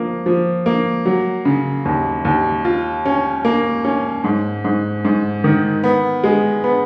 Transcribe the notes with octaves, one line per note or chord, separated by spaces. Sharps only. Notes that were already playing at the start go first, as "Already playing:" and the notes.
Already playing: F3 A#3
F3
A#3
F#3
C#3
D#2
D#2
F4
C#4
A#3
C#4
G#2
G#2
G#2
D#3
B3
G#3
B3